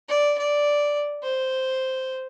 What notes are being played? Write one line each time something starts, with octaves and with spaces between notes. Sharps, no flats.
D5
D5
C5